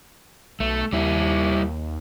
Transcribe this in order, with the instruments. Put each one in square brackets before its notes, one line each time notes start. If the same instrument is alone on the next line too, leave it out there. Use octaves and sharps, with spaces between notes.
[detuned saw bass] B1 [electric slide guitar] A3
[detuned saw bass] D#2 [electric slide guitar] G3 E4